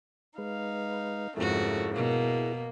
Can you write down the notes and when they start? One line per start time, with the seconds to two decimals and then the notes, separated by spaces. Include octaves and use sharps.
0.38 G#3 D#4 B4 F5
1.37 F2 G#2 C#3 A3 E4 F#4 G#4 A#4
1.95 B2 A#3